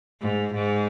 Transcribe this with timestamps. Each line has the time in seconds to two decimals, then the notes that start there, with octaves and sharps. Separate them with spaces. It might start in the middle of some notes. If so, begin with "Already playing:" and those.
0.21 G#2
0.54 G#2